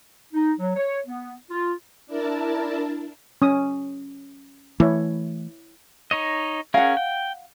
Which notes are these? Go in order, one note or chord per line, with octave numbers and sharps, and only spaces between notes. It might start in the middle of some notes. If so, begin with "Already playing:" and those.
D#4
F#3
C#5
B3
F4
D4 E4 A#4 A5
C#4 D#6
E3 A3 E4 C#5
D#4 C#5 D#5
C#4 G#4 A#4 F5 F#5
G5